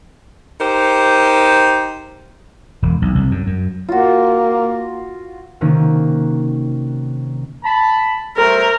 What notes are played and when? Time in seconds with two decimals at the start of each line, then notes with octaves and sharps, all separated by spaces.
0.60 D#4 G4 A#4 C5
2.82 E1
3.02 B1
3.15 C2
3.31 F#2
3.47 F#2
3.89 A#3 F4 F#4
5.61 C3 D#3 A#3 C#4 F#4
7.64 A5 B5
8.37 G3 A3 A#4 C5